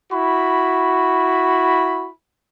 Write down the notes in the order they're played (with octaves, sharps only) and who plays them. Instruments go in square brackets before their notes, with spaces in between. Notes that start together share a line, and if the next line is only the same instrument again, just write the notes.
[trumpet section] E4 F#4 B5